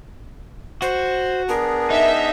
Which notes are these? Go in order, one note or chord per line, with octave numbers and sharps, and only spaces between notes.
F#4 C5
B3 D4 G#4 A#4
D#4 E5